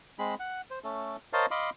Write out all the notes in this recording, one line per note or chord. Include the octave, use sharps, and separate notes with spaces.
G#3 C4 G#4 B5
F#5
C5
A3 C#4 A4
A#4 C5 C#5 D#5 F5 A5
D#5 F5 B5 C6 D6